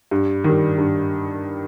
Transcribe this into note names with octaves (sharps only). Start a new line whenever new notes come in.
G2
D#3 G3
G2